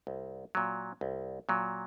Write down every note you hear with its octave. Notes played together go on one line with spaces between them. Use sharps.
C2
A#2 F#3
C2
A#2 F#3